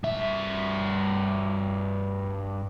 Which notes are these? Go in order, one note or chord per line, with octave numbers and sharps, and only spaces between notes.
G2 E5